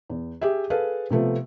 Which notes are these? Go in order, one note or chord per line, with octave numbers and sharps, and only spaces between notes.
E2
G4 G#4 E5
G#4 A4 B4 F5
C3 F3 A3 B3